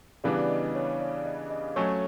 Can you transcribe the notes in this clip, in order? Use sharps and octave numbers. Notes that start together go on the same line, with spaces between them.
C#3 E3 G3 B3 D4 D5
D#5
C#5
D5
D#5
D#5
F#3 A3 C#4 C#5